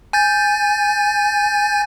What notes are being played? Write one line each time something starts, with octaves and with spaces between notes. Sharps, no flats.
G#5 G6 A6